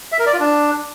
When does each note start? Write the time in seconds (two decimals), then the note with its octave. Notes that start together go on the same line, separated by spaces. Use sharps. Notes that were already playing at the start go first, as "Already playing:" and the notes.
0.12 E5
0.19 A#4
0.26 D5
0.33 F4
0.40 D4